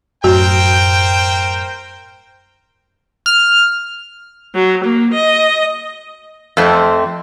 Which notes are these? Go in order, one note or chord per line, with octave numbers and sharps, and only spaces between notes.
F#2 A2 F#4 A#4 C5 G5
F6
F#3
A#3
D#5
F2 A3 C4